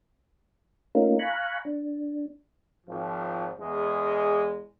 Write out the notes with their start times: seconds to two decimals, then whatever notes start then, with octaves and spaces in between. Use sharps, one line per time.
0.95 A3 A#3 C#4 D#4 F4 A#4
1.19 F5 G#5 A#5 B5 C#6 F#6
1.65 D4
2.86 G#1 F3
3.58 E2 G#3